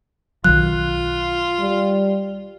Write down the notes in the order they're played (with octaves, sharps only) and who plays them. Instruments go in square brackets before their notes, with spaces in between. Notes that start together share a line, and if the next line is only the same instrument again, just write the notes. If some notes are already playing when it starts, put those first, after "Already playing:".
[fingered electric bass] B1 D#3 F#3 [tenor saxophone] F4 [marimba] F#6
[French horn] G3